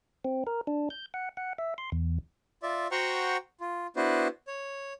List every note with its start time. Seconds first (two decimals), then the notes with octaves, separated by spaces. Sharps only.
0.25 C4
0.47 A#4
0.67 D4
0.90 G6
1.14 F#5
1.37 F#5
1.58 E5
1.78 C6
1.92 E2
2.63 F4 D5 E5
2.91 F#4 C5 F#5 G5 A#5 C#6
3.61 F4
3.96 B3 D4 E4 F#4 B4 C5
4.48 C#5